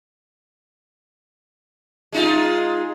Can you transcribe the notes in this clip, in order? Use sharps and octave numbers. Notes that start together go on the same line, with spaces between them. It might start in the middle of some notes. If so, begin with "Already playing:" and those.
G#3 D#4 F4